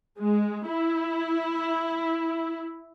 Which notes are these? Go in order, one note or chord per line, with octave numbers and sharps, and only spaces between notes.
G#3
E4